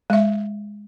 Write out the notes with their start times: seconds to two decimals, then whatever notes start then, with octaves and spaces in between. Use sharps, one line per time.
0.10 G#3 E5